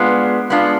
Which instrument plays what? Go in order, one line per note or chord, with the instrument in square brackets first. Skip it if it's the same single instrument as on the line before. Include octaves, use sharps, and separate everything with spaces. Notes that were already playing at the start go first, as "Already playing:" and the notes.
Already playing: [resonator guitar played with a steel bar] G#3 B3 D4 F4
G#3 B3 D4 F4